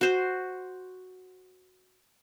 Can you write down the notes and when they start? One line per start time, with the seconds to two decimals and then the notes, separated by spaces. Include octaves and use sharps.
0.01 F#4 C5